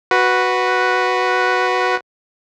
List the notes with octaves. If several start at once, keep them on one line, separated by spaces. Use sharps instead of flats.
F#4 B4